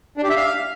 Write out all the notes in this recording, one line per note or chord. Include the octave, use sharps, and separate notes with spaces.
D4
G4
E5
F5